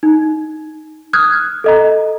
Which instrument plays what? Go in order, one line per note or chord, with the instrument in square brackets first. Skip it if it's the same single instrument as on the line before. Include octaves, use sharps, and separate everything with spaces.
[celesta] D#4
D#6 F6 F#6 G#6
A4 D#5 A#5